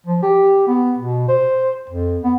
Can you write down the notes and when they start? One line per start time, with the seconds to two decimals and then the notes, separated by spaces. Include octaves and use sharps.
0.07 F3
0.23 G4
0.68 B3
0.99 B2
1.29 C5
1.90 F2
2.24 B3